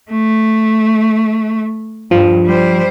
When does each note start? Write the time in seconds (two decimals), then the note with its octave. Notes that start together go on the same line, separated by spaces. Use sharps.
0.11 A3
2.11 G2 F3
2.45 G3 C5